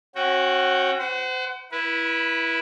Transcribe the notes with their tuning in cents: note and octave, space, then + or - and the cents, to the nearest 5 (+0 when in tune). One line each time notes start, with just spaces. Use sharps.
C#4 -35 F#4 +0 G5 -25
C5 -30 F#5 +30
E4 +0 B4 -30